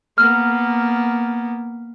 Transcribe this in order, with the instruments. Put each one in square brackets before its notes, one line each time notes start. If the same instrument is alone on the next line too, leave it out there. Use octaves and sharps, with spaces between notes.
[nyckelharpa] A#3 B3 [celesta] F6